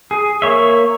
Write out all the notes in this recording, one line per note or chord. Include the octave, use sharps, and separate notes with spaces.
G#4
A#3 C#5 E5